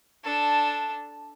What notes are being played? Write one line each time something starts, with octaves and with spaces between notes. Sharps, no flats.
D4 A4